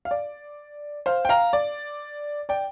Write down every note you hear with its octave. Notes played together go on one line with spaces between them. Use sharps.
F5
D5
C5 F5
G5
F5 A#5
D5
D5 G5